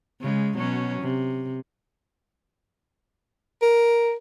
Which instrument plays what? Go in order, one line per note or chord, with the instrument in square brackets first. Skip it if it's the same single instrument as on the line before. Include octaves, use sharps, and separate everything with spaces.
[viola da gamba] C#3 G#3
B2 F#3 C#4
C3
[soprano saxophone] A#4